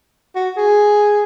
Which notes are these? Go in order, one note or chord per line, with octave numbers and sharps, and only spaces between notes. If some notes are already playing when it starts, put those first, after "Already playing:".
F#4
G#4